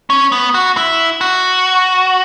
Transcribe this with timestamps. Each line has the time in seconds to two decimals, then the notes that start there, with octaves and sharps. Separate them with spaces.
0.10 C#4
0.32 B3
0.54 F#4
0.77 E4
1.21 F#4